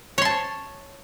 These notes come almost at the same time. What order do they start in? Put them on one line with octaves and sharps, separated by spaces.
C#5 C6 A5